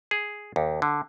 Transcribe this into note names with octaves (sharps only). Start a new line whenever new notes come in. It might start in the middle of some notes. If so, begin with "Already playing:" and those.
G#4
D#2
D3